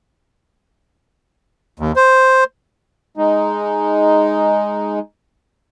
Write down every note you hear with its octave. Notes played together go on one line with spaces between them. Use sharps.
D#2
C5
G#3 D#4